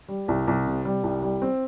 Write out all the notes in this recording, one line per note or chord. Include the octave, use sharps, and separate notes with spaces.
G3
C2
C2
C3
G3
C2
G3
C4